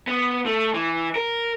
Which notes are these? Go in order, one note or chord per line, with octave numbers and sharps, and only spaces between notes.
B3
A3
E3
A#4